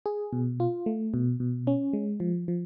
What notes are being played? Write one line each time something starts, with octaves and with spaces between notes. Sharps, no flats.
G#4
B2
F4
A3
B2
B2
C#4
G#3
F3
F3